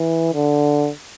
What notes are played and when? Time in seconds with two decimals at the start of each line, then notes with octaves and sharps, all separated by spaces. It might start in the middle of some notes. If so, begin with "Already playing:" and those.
Already playing: E3
0.34 D3